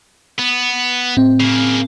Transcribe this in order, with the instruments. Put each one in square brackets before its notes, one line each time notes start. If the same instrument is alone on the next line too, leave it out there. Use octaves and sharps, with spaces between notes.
[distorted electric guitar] B3
[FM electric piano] A2 C4
[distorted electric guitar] C#3 A#3